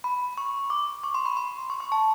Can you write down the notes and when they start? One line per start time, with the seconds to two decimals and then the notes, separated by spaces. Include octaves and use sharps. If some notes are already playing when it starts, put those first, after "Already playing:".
0.04 B5
0.38 C#6
0.70 D6
1.04 C#6
1.15 C6
1.26 B5
1.37 C6
1.70 C#6
1.80 C#6
1.92 A5